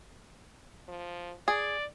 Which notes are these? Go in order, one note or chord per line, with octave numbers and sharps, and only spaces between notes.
F3
G#4 D5